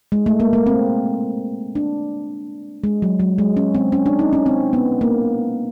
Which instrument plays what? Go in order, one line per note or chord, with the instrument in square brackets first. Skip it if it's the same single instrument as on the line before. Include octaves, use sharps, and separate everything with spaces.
[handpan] G#3
A3
A#3
A#3
C4
D4
G#3
F#3
F#3
G#3
C#4
C4
C#4
D4
D#4
C#4
C4
B3
A#3